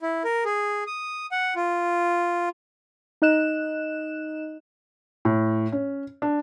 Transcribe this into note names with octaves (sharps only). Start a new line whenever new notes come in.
E4
A#4
G#4
D#6
F#5
F4
D#4 D#5 F#6 E7
A2
C#4
D4